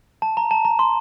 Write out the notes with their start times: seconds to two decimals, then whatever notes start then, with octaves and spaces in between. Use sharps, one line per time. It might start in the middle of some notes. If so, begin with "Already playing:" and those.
0.22 A5
0.37 A#5
0.51 A5
0.65 A#5
0.79 C6